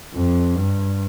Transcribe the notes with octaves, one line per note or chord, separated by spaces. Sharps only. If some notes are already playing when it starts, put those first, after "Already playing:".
F2
G2